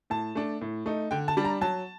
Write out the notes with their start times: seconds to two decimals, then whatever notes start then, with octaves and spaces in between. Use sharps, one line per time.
0.10 A2 A5
0.35 A3 D4
0.61 A2
0.86 A3 D#4
1.11 D3 G5
1.28 A5
1.37 G3 D4
1.45 A#5
1.61 F#3 A5